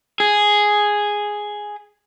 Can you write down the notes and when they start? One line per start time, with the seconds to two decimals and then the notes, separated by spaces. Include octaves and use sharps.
0.20 G#4